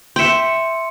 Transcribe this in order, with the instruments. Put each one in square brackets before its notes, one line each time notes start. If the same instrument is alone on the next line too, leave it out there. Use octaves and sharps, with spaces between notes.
[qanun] E5 G5 [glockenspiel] C6 C#7